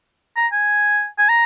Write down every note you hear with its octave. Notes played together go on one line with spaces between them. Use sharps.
A#5
G#5
G#5
A#5